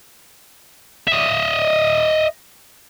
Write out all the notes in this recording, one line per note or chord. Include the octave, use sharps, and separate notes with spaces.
D#5 E5